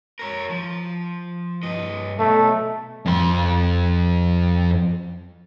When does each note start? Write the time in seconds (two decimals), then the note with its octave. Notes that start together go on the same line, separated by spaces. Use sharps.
0.19 A#4 C#5
0.50 F3
1.63 G2 D#5
2.19 B1 A3
3.06 F2 C6